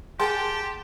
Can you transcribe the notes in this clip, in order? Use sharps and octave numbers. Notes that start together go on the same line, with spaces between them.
G4 G#4 A#4 F#5 G5 A5 C6